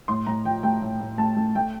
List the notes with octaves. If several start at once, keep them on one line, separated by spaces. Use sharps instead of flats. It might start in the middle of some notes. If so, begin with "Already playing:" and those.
A2 C6
A2 A#5
F3 G5
A3 G5
A2
A2
A3 A5
A3
A3 G5